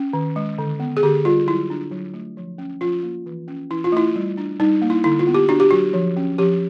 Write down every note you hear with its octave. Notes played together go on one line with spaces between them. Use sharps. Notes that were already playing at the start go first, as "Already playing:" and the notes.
Already playing: C#4
D#3
G#3
D3
B3
G#4
D3 G4
G3 F4
F#3 E4
D4
F#3
A3
F3
C#4
F3 F4
A#3
E3
C#4
E3 E4
F4
A3 E4
G3
D4
G3 D#4
A#3
E4
D3 E4
F4
B3
G4
D4 F#4
G4
F#3 F#4
F3
C#4
F3 G4